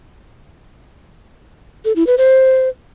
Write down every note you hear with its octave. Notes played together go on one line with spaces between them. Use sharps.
A4
E4
B4
C5